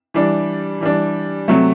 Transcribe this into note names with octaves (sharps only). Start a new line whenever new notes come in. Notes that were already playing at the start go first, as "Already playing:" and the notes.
E3 G3 D4
E3 G3 D4
C3 F#3 A3